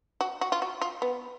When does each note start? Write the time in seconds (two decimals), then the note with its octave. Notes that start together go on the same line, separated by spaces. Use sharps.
0.21 F#4
0.41 F#4
0.52 F4
0.62 F#4
0.82 F4
1.02 B3